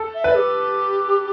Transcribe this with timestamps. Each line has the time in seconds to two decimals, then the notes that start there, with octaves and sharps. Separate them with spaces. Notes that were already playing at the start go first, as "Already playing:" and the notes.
Already playing: A4
0.14 E5
0.24 B4
0.35 G4